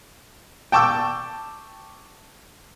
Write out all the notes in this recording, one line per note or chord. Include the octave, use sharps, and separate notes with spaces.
G5 A5 C#6 D6 E6